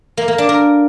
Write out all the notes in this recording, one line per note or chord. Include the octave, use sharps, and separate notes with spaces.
A#3
A#3
D4
A#4